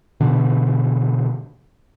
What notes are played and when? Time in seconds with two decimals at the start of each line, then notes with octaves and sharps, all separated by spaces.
0.20 B2 D3 E3